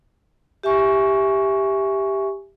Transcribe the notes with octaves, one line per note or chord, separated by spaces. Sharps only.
G4 E5 G#5 C#6